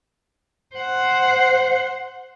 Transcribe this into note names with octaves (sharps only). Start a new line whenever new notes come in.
C5 F#5